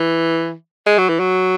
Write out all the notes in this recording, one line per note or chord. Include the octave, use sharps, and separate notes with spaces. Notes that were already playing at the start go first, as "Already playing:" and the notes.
Already playing: E3
G#3
F#3
E3
F#3